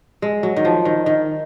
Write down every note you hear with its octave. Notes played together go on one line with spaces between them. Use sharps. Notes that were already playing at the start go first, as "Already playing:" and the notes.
G#3
F#3
D#3
F3
D#3
D#3